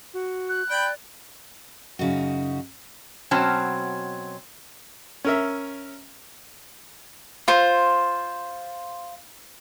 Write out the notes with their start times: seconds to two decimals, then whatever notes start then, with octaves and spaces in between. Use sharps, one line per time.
0.13 F#4
0.49 F#6
0.70 D5 G5 B5
1.99 F#2 C#3 D#4 F#4
3.31 B2 F#3 C4 C#4 A5
5.25 C#4 A#4 E5
7.48 F4 C5